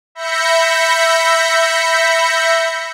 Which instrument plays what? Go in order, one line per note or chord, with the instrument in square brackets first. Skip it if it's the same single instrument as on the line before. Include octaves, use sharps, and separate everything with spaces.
[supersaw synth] E5 B5 G6 A#6 C#7